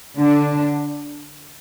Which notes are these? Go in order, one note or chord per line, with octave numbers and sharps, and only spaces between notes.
D3 D4